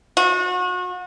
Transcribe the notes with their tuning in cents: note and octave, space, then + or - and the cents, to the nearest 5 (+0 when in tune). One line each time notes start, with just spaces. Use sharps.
F#4 -35